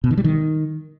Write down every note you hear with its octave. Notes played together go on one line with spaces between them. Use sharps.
B2
D#3
G3
D#3